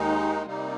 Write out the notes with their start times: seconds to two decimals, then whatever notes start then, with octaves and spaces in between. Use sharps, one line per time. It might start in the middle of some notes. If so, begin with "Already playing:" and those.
Already playing: D#2 D#3 G#3 D#4
0.45 C3 G3 A#3 D#4